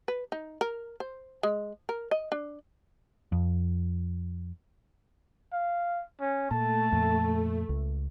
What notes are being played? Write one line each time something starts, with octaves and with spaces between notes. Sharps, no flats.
B4
D#4
A#4
C5
G#3
A#4
D#5
D4
F2
F5
C#4
A#2 A3 A5
F2 A#2
C#2